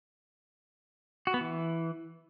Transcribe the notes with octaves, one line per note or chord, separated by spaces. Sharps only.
F#4
B3
E3